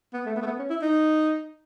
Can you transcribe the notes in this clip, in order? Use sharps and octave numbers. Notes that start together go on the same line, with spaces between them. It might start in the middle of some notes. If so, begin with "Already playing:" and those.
B3
A3
B3
A3
B3
C#4
E4
D#4